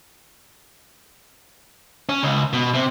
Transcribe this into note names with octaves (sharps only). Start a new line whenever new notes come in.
C#4
C#2
B2
C3